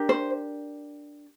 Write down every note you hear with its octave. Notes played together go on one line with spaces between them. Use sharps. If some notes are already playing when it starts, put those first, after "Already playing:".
Already playing: D4 G4 A#4
C5